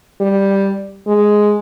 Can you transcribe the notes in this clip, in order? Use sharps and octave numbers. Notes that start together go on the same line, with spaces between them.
G3
G#3